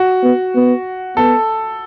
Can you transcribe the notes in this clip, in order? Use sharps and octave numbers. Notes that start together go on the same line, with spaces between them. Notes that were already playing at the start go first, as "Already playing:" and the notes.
Already playing: F#4
B3
B3
B3 A4